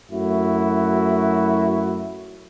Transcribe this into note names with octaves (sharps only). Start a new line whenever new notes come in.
F#2 A3 E4 F#4